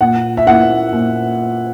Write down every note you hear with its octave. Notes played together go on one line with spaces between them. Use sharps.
A#2 F#5
E5
A#3 E4 F#5
A#2